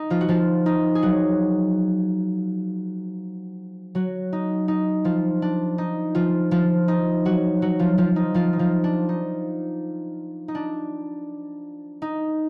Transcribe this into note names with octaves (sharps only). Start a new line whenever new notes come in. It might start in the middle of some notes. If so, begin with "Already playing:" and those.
Already playing: D#4
F3 F4
F#4
F3 F4
D#4
G#4
F#3 F#4
F#3 F#4
D#4
D#4
F3 F4
D4
D#4
F3 F4
F3 F4
D#4
F#3 F#4
F#3 F#4
F3 F4
F3 F4
D#4
F3 F4
D#4
F3 F4
D4
D#4
D#4
D4
D#4